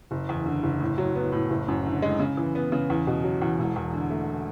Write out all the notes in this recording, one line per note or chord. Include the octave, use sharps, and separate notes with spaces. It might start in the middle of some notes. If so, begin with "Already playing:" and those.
F#1
E2
D3
F#1
A2
F#3
B3
A2
F#1
F#2
D3
G#3
C#3
E3
B3
C#3
E2
B2
F#3
E2
E1
E2
D3
A3